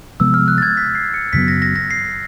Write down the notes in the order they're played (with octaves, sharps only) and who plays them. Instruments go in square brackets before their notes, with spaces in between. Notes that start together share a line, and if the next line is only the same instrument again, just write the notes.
[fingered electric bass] C3 F3 G#3 B3 [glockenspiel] E6
[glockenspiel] F6
F#6
A6
G#6
B6
C7
C#7
[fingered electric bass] F#2 C#3 F#3 B3 [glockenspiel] B6
[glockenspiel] A#6
A#6
A#6
C7